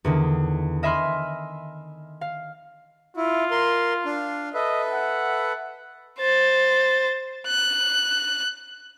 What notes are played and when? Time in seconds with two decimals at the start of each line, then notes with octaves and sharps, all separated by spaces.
0.05 E2 D3 D#3
0.83 D#5 E5 G#5 B5 C6 F6
2.21 F5
3.17 E4 F4
3.51 A#4 C6
4.05 D4 F5
4.54 A4 B4 D#5 E5
4.92 F#5
6.19 C5 A6
7.47 F#6